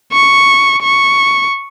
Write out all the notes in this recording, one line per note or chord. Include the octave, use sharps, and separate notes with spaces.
C#6
C#6